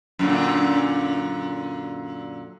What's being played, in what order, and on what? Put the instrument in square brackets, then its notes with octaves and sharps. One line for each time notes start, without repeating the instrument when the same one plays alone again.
[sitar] F#2 A#2 D3